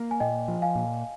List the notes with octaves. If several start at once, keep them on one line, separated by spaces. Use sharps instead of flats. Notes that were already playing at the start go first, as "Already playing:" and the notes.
Already playing: A#3
G#5
A#2 D#5 G5
F3
F5 G#5
A#2